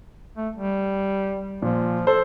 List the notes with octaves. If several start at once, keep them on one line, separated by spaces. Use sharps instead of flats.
A3
G3
A#2 F3
A4 C5